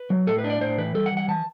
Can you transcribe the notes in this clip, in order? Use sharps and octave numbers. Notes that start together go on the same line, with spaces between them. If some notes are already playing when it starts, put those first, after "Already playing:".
Already playing: B4
F#3
A2 A4
B4
D4
D5
A2 C5
E3 B4
G3 A4
F#5
E3
F#5
E3 A5